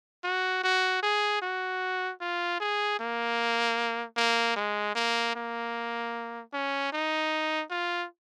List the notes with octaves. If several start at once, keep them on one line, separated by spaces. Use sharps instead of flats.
F#4
F#4
G#4
F#4
F4
G#4
A#3
A#3
G#3
A#3
A#3
C#4
D#4
F4